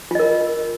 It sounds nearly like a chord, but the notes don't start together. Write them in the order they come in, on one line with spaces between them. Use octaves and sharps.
F4 D#5 A#4